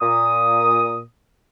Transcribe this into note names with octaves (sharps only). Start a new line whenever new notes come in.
A#2 D#6